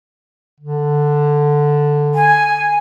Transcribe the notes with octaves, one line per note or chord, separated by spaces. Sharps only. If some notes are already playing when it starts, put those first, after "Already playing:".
D3
G#5